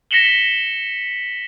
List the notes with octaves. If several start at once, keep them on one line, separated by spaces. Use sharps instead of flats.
A#6 B6 C#7 E7 F#7 G7